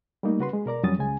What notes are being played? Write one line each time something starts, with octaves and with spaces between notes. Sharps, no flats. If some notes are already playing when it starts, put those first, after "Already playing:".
G3 A3 A#3 D#4
C#3 F#4 B4 C6
G#3
B2 A#4 D5 A#5
F2 F#3 G3 C#4 D#6 A6
C#2 C#3 G#3 G#5